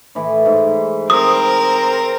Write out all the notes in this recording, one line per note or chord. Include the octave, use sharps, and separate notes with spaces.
A2 E3
G#2
C4 A#4 D#6